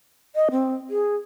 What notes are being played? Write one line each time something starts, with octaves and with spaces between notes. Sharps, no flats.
D#5
C4
G#4